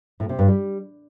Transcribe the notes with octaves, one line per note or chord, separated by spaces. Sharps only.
A2
C3
G2
G3